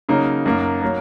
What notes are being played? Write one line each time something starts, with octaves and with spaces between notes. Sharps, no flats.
C#3 F#3 A#3 D#4
F#2 F#3 A#3
F#3 A#3